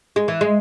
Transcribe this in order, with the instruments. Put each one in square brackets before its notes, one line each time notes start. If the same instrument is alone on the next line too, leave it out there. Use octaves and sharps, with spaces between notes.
[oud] G#3
E3
G#3